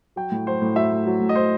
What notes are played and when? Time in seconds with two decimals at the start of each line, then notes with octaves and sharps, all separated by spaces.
0.16 F#3 G5
0.32 A2
0.47 F#3 C5
0.62 A2
0.76 F#3 E5
0.92 A2
1.06 F#3
1.20 A2
1.29 D#5
1.35 F#3 C5